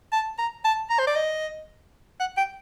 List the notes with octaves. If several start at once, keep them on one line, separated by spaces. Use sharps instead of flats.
A5
A#5
A5
A#5
C5
D5
D#5
F#5
G5